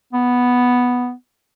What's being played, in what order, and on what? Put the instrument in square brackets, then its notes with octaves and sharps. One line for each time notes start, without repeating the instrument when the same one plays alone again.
[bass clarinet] B3